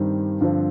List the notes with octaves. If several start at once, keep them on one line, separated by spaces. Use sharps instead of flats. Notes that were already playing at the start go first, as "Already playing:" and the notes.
Already playing: G2 D#3 G3 C4
G2 D3 F3 C4